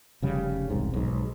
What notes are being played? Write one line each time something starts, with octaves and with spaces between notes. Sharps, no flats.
F1 C#3 G3
E1 C2 G#2
B1 G#2